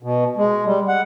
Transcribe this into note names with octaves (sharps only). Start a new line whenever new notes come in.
B2
G#3
G3
F#5